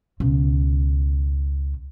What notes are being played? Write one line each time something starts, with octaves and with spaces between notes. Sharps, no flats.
C#2 B2